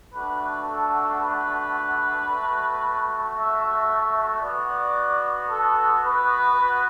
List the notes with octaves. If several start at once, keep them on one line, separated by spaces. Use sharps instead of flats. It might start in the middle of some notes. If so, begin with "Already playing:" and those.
A3 D4 F#4 B4
A4
B4
A3 F#4
E5
B3 F#4 D5
A4
B4
B3 F#4